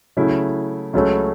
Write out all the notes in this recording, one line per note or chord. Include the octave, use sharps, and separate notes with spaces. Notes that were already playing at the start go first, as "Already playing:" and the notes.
C#3 F#3 A3 E4
C#2 C#3 F#3 A3 C#4